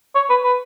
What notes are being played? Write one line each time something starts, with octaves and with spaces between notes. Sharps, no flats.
C#5
B4
B4